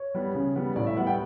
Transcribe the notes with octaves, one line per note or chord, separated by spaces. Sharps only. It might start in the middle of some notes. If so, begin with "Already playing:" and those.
Already playing: C#5
G3 B3
C#3
G3 B3
A2 D5
E5
G3 B3 F#5
G5